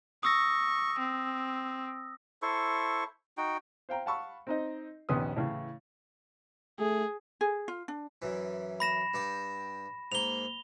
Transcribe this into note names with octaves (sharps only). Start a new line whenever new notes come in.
C#6 D#6 E6 A#6
C4
E4 A4 C5 C#6
D#4 F#4 G5
C5 F5 G5 A#5
F5 F#5 A5 B5 C#6 E6
C4 D#4 D#5
A#1 D#2 B3 C#4 C6 D#6
A2 C#3 E3
A3 G#4
G#4
F4
D4
F#2 E3
B5 A#6 E7
G2 D5 G5
G#2 A#3 F7 G7